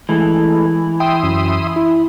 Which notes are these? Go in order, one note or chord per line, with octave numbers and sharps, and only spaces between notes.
E3 G#3 A3
E5 G5 C6 D#6
F#2
E4